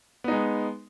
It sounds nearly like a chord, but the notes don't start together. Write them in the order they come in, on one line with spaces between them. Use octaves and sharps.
B3 D#4 G#3